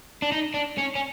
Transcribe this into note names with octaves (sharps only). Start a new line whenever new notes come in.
D4
D#4
D4
C#4
C#4